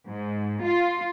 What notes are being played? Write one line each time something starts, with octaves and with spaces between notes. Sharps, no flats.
G#2
F4